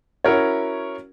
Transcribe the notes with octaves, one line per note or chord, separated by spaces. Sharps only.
C#4 E4 F#4 A#4 C#5